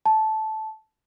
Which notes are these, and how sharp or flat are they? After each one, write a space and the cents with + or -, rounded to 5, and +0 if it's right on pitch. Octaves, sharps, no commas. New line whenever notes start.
A5 -10